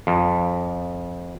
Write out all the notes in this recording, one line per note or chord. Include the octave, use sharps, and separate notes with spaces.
F2